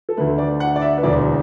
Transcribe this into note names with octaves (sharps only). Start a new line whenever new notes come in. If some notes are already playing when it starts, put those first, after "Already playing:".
A4
D2 D3 A3 B4
D5
F#5
D5
E5
B4
E1 D2 D3 D5